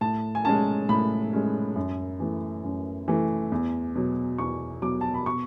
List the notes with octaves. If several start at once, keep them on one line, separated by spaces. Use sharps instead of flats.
A2 A5
G#5
G#3 C#4 A5
A2 B5
G#3 C#4
F#2
E3 A3
F#2
E3 A3
E2
B2 F#3
E2 C#6
B2 F#3 D6
A5
B5
B2 C#6